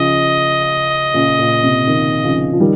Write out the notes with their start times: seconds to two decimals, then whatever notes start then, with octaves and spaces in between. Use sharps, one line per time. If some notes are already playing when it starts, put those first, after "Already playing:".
Already playing: C#3 F3 D#5
1.14 A#2 C#3
1.39 A#2
1.63 C3
1.87 C3 D#3
2.24 C#3 F3
2.53 F3
2.60 D#3 G3